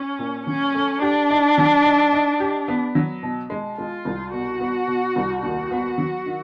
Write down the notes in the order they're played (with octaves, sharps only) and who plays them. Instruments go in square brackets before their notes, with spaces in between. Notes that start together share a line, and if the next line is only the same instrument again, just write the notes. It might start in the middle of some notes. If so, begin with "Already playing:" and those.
Already playing: [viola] C#4
[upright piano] A#2
[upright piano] F#3 [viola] C#4
[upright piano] A3
[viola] D4 [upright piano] G4
[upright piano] D#4
F#3
D#4
D#4
G4
B3
F#3
B2
G#3
[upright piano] G#3 [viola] F4
[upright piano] C2
[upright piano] B2 [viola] F#4
[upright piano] B3
B2
C2
[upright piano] D#2 [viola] F#4
[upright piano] B3
F#3
D#3